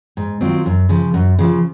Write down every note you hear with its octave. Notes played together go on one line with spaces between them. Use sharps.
G#2
D#3 F#3 C4 F4
F#2
C#3 F3
F#2
C#3 F3